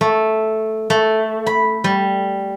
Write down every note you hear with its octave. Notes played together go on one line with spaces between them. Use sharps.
A3
A3
B5
G3